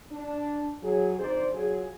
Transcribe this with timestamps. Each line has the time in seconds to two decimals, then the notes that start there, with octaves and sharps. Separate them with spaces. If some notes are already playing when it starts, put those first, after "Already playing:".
0.12 D4
0.82 F#3 G#4
1.18 F2 D3 D#4 C5 D5
1.53 F#3 F4 G#4